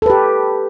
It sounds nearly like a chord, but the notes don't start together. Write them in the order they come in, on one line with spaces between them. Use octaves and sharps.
A4 B4 G4